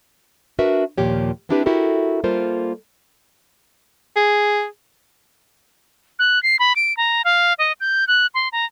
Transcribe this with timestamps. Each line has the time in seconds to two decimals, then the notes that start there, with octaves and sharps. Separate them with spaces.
0.59 D4 F#4 A#4 B4 E5
0.98 D#2 A#2 F3 G4 C#5
1.49 B3 C4 D4 E4 G4 B4
1.66 E4 F#4 G4 A4 A#4
2.24 G3 A#3 F4 A4 A#4 C5
4.16 G#4
6.19 F#6
6.43 C7
6.59 B5
6.76 D7
6.97 A#5
7.25 F5
7.58 D#5
7.80 G6
8.08 F#6
8.35 C6
8.52 A#5